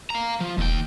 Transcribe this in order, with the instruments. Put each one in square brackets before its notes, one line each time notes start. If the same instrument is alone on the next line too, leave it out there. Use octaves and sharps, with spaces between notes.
[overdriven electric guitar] F5 A#5
F3
[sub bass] E1 [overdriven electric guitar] D#2 G5